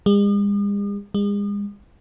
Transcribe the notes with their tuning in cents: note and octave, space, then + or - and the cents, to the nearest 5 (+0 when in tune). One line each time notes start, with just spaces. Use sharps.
G#3 -45
G#3 -40